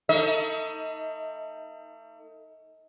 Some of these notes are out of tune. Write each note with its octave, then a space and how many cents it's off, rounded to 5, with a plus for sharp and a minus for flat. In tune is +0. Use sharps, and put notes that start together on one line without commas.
A3 +40 D#4 +30 D#5 +45